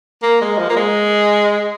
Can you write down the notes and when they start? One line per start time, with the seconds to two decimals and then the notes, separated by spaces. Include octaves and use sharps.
0.22 A#3
0.41 G#3
0.59 F3
0.70 A#3
0.77 G#3